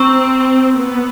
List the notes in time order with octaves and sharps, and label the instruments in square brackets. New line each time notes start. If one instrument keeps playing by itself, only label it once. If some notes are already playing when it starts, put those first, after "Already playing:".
Already playing: [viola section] C4 [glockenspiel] A#5 C#6 E6
[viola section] B3